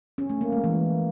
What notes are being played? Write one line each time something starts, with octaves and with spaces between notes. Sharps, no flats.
C#4
A3
A#3
G#3
E3